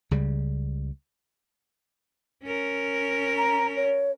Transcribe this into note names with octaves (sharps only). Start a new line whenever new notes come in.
C#2 C#3 G3
C#4 A#4
A#5
C#5